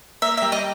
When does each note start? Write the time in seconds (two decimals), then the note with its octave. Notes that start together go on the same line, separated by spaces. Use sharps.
0.22 A#3 E5
0.37 E5
0.42 G3
0.52 D#5